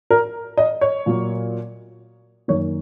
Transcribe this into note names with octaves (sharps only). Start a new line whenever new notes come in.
A#4
D#5
C#5
A#2 F#3 A#3
F#2 D#3 A#3 C#5